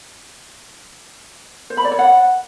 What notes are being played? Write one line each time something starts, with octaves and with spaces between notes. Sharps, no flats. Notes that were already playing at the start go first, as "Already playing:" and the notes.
C5
B5
D5
C#5
F#5